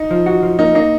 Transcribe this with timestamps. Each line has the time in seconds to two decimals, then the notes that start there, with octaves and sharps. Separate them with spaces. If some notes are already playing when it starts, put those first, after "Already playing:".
Already playing: D#4
0.11 F3
0.26 F#4
0.43 F3
0.59 A#3 D#4
0.75 A#3 D#4